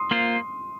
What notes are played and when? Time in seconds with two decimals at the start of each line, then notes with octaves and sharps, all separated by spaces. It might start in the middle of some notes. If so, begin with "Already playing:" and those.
Already playing: C6 D#6
0.11 A#3 F4 C5